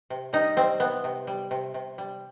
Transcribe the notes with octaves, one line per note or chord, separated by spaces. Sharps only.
C3
G3 D#4
G3 C4
C3 B3
C3
G3
C3
C3
G3